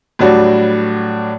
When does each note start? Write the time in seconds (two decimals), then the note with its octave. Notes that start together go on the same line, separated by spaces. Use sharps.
0.19 A2 F#3 G3 D4 F#4